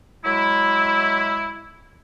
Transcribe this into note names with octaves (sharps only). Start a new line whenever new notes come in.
F#3 G#3 E4